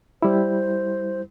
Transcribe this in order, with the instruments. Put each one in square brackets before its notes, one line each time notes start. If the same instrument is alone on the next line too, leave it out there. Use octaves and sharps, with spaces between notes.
[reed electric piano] G3 E4 [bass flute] C5